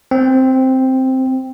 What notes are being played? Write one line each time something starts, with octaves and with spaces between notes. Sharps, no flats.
C4